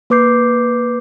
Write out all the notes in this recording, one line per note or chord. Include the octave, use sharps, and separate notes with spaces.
A#3 B4 D6 G6 C7